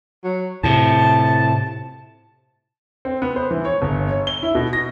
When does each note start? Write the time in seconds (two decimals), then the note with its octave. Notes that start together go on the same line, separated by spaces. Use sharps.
0.24 F#3
0.64 A2 C3 A5
3.05 C4
3.22 B3
3.36 C5
3.51 E3
3.65 C#5
3.82 G1
4.07 C#5
4.27 G7
4.43 E4
4.55 B2
4.73 A#6